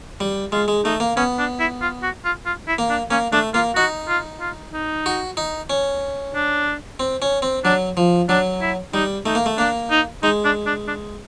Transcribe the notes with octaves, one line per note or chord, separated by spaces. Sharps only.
G3
G#3 F4
G#3
A3 D#4
A#3
B3 C#4
D4
E4
F4
F#4
F4
F4
E4
A#3
D4
A#3 C#4
A3 D4
A#3 F4
D#4 F#4
F4
F4
D#4
F#4
D#4
C#4
D4
C4
C#4
C4
F#3 D4
F3
F#3 D4
E4
G3 D#4
A3 D#4
A#3
A3
A#3 D4
D#4
G#3 D#4
D4
D4
D4